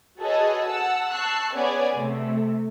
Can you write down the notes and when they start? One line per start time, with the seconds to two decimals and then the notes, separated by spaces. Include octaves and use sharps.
0.20 F#4 G#4 A4 B4 C#5 D#5
0.65 F#5 A5 E6
1.11 A5 C#6 E6 F#6 C7
1.53 B3 C#4 G#4 C#5 D5 G#5
1.96 C3 A3